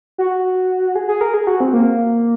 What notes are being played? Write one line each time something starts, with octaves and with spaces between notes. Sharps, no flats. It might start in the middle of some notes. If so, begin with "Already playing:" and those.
F#4
G#4
G#4
A#4
G#4
F#4
C4
A#3